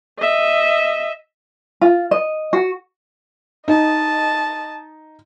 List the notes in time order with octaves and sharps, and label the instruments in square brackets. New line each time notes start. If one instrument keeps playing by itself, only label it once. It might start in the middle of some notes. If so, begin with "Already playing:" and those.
[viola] D#5 E5
[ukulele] F4
D#5
F#4
[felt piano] D#4 [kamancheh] D#5 A5